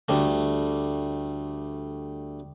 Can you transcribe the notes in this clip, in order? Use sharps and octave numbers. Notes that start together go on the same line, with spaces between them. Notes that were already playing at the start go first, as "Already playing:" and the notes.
D2 G3 A3